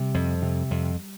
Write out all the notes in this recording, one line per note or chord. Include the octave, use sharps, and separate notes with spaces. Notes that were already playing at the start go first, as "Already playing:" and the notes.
Already playing: C3 G3
F2
C3
F2